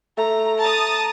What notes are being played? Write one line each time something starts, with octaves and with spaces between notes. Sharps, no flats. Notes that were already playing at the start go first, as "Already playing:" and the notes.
A3 A#5
A5 A#5 D#6